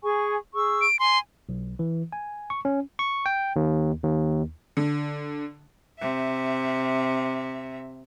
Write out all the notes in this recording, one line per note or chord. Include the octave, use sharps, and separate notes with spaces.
G#4 G#5 C#6
G#4 C#6 E6
D7
G#5 C6
B1
E3
G#5
C#6
C#4
C#6
G5
D#2
D#2
D3
C3 E5